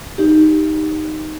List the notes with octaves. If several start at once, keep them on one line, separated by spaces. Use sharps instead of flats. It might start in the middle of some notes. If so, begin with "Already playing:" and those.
D#4 G4